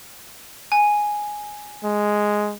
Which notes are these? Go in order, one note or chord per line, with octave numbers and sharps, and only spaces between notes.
G#5
G#3